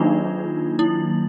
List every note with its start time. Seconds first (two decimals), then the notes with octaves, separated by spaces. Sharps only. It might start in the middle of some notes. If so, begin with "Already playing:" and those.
Already playing: D#3 F#3 A#3 D4 D#4 F4
0.79 E4